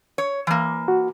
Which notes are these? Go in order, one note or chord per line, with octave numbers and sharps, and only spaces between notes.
C#5
E3 A#3
F#4